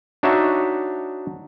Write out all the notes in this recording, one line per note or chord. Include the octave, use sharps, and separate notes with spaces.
D4 D#4 F#4 C#5 E5